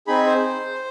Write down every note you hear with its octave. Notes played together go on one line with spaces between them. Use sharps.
C4 D#4 G#4 B5
C5